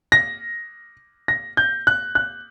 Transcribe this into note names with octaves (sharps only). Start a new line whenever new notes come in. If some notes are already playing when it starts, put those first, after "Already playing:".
A#6
A#6
G6
F#6
F#6